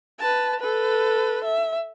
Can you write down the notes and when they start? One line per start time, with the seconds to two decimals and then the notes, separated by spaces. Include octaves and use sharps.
0.20 B4 A5
0.60 A4 B4
1.44 E5